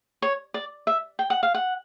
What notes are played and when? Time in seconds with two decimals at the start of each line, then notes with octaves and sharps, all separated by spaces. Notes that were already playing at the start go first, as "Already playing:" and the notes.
0.22 C#5
0.54 D5
0.87 E5
1.19 G5
1.30 F#5
1.43 F5
1.54 F#5